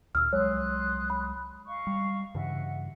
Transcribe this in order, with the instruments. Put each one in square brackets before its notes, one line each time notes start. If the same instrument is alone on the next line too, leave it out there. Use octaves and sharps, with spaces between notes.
[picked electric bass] D2 A#2 [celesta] E6 F6
[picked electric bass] C2 F#3 G#3 [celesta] C#5 [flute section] C6 D#6 F#6
[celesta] B5
[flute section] D#5 F5 C#6
[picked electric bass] G3
[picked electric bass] G2 C#3 E3 [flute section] D#5 E5 F#5